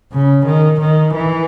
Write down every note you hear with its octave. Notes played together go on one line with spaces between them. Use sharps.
C#3
D#3
D#3
E3